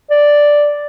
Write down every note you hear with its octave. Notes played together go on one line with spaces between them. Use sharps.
D5